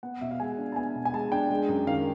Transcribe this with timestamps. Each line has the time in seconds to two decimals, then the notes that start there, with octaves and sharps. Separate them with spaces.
0.03 B3 F#5
0.21 B2 E5
0.31 F5
0.40 G#3 G#5
0.58 D4
0.72 A5
0.76 B3 G#5
0.95 B2
1.05 G#5
1.13 G#3 A5
1.32 D4 G5
1.50 G#3
1.68 F#2
1.87 D#3 F5